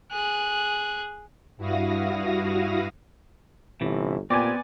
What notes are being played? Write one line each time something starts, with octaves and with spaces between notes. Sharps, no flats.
G#4 F#6
G2 E4 F#4 F5 D#6 A#6
G1 C3 E3
A#2 B3 C4 G4 D5 G#5